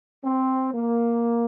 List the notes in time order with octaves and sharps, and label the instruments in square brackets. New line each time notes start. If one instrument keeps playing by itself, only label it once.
[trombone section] C4
A#3